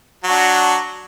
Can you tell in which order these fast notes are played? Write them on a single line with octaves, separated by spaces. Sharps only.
F#3 F#4 D4